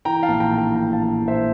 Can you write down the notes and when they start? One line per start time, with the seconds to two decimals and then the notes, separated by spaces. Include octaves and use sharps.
0.05 E3 G5 A#5
0.23 F5 A5
0.29 A#1
0.40 G5 A#5
0.52 A2
0.58 G5 A#5
0.75 A#1 G5 A#5
0.93 F5 A5
0.98 E3
1.22 A#1
1.28 C5 E5